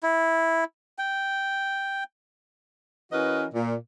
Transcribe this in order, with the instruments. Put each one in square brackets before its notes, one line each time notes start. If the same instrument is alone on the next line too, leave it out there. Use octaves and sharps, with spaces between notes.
[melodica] E4
G5
[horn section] E3 C#4 F#4 A#4 B4 D#5
A#2